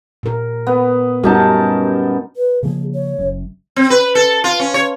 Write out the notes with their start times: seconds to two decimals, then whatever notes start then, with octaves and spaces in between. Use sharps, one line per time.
0.23 A#2 A#4
0.67 B3
1.24 F#2 G3 D#4 F#4 A#4 A5
2.36 B4
2.63 C#3 F3 A#3 G#4
2.94 C#5
3.19 F#1 F#2
3.76 C4
3.90 B4
4.15 A4
4.44 F4
4.60 C#4
4.74 C#5